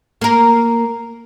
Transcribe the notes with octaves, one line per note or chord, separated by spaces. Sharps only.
A#3 A#4